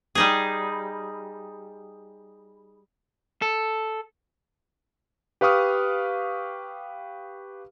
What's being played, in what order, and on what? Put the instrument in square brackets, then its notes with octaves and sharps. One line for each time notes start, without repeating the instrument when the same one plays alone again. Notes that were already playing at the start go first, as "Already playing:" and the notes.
[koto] G3 D#4 G#4
[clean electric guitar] A4
[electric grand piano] G4 B4 F5 C#6 D#6 F6